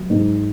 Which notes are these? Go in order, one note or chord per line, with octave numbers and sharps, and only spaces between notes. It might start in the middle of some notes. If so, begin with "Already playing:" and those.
Already playing: F#3
G#2